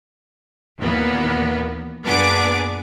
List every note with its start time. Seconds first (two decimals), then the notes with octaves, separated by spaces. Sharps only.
0.78 D#2 A#2 E3 A#3 B3
2.03 F#2 A#2 B3 D4 G#4 D6